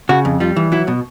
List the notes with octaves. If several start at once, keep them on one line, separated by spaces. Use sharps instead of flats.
C#3 F#4
F2
G3 F4
E3
F#3 E4
B2